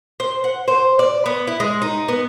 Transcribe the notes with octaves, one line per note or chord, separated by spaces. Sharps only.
C5
F#5
C5
D5
B3
E4
G#3
D#4
B3